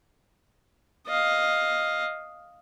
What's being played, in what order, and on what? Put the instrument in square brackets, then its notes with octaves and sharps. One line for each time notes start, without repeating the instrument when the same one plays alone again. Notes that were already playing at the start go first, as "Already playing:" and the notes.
[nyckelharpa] D#5 F5